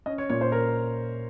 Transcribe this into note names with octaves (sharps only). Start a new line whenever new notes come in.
C#4 D#5
C#5
A#2 C#5
C5
A#4